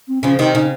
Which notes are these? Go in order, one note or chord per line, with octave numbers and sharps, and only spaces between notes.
C4
C#3 F3 C#4
C3 D#3 D#4
C#3 D#4